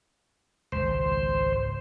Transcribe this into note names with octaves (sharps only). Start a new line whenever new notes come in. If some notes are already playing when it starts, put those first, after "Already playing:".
G#1 C#2 C5